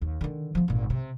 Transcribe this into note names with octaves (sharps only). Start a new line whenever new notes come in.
D#2
D3 D#3
F3 B3
G#1 A#2
C3